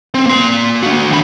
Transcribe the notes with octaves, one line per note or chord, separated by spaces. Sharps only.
C4
A#3 C6
D4 F#4
D#2 B5